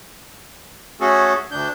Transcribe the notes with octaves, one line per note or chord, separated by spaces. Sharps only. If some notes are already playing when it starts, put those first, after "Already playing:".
A3 C#4 F#4 G#4 A4
D2 D4 G6